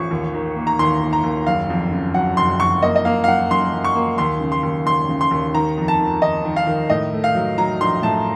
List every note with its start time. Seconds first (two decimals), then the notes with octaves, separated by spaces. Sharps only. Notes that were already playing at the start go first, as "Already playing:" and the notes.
Already playing: A1 F3 C#6
0.11 D#2
0.34 D#3
0.56 A#3
0.67 A#5
0.79 D#2 C6
1.01 A#3
1.13 A#5
1.23 D#2
1.47 F#1 F5
1.70 F2
1.92 C#3
2.14 F#3 F#5
2.37 F#1 C6
2.60 F2 C#6
2.82 A#3 D#5
2.96 D#5
3.05 A#3 F5
3.24 F5
3.27 F#2 F#5
3.50 F#2 C6
3.73 F#2
3.84 C#6
3.95 A#3
4.18 D#2 C6
4.41 C#3
4.52 C6
4.63 D#2
4.86 D#2 C6
5.08 C#3
5.21 C6
5.31 D#2
5.54 D#3 A#5
5.77 F2
5.88 A5
5.99 D#3
6.22 D#3 D#5
6.45 D#3
6.56 F5
6.67 D#3
6.90 A2 D#5
7.13 A3
7.24 F5
7.35 F#3
7.58 F#3 A#5
7.81 A#1 C6
8.03 A2 A5